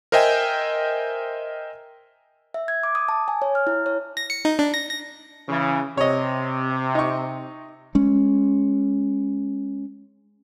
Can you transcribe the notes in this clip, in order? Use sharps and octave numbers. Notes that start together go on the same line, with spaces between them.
A#4 C5 D#5 E5 G5 G#5
E5
G#6
D6
D#6
A5
G#5
C#5
F6
E4
C#5
A#6
C#7
D#4
D4
A#6
A#6
C#3 E3
C3 C#5 D#5
D#4 C#6
G#3 C#4